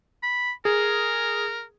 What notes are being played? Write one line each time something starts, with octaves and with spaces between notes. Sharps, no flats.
B5
G#4 A#4